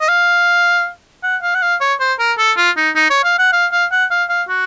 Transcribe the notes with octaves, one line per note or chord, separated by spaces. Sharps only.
D#5
F5
F#5
F5
F#5
F5
C#5
C5
A#4
A4
F4
D#4
D#4
C#5
F5
F#5
F5
F5
F#5
F5
F5
F#4